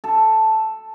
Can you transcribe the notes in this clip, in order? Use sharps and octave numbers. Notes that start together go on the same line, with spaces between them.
A4